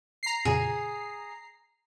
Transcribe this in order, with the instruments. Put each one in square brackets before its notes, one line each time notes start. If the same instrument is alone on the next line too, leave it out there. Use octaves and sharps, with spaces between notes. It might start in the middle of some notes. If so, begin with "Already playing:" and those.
[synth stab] A#5 C7
[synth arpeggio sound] F2 A#2 C#3 [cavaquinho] G#4